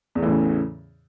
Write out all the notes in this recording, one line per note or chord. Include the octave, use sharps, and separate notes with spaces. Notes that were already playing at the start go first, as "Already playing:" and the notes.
E2 A2 C#3 E3 A3